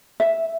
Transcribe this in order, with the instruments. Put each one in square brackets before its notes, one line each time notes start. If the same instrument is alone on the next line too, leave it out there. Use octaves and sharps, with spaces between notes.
[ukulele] E5